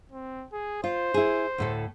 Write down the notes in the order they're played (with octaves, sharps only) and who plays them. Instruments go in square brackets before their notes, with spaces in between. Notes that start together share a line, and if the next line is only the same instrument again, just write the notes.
[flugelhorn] C4
G#4
[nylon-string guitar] F4 [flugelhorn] C5
[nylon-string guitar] E4 G#4
D2 A2 A4